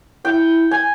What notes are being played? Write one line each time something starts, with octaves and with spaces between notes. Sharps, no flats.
E4 G5
G#5